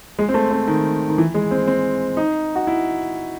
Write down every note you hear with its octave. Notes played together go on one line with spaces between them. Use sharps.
G#3
C4
A3
C4
D#3
D#3
E3
G#3
C4
C4
D#4
F#4
E4